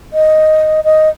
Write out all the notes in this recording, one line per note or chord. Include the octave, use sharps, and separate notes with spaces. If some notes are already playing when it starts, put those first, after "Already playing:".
D#5
D#5